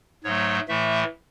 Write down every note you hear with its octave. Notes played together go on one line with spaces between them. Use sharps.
G#2 F#3 A3 C#5
A2 E3 A3 E5